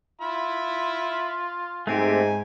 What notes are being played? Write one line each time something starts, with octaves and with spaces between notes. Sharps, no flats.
F4 E5 B5
G#2 A3 C4 G4 G#5